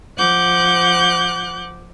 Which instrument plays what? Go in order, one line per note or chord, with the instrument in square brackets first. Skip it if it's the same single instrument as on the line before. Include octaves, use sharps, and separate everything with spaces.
[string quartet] F3 F#5 D6 F#6 G6